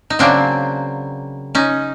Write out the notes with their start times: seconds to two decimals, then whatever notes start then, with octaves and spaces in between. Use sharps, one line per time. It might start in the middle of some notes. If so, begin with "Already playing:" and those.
0.10 D#4
0.19 C#3 F#3 A#3 C4 D4
1.55 C#4 D#4